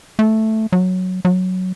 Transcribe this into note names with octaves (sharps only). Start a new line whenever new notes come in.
A3
F#3
F#3